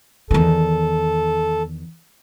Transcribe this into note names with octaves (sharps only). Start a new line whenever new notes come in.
E2 D#3 A4